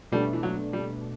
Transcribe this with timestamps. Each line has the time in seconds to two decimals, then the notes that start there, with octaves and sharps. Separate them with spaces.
0.12 B2 G3 A3 D4
0.33 E3
0.43 F#3
0.73 G3